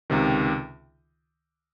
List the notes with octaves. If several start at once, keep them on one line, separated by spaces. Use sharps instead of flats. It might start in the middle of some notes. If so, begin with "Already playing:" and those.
C#2 C3 D#3